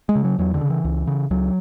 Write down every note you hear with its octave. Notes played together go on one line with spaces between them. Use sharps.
G#3
C#3
F#3
E2 F#3
D3
C#3
E3
C#2
C#3
C#2 F#3